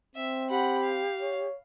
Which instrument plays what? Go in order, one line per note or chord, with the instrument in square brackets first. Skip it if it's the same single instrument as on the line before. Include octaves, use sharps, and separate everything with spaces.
[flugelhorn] C4 [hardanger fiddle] E5
[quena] G4 [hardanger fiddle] F#5 B5
[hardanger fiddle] F5
[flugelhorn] C#5